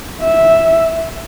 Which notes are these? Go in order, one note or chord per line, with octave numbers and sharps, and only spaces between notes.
E5